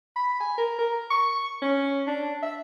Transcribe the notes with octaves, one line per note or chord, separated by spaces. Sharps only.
B5
G#5
A#4
A#4
C#6
C#4
D4
E5